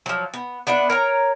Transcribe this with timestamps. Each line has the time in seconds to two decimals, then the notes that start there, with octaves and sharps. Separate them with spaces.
0.06 F3 F#3
0.34 B3
0.67 B3 D4 E4 F#5
0.90 A#4 C#5 A#5